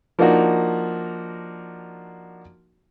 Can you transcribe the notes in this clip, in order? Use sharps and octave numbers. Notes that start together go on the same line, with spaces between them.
F3 A#3 D4 D#4 F#4 A#4